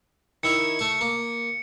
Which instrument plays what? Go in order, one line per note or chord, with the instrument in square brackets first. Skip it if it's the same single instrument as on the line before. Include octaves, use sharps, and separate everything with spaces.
[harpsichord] D#3 E4 C#5 [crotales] C#7
[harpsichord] A3 C#6
A#3